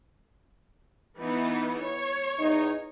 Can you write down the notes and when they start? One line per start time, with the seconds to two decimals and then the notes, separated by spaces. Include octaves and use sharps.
1.18 E3 B3 D#4
1.81 C#5
2.39 E2 D#4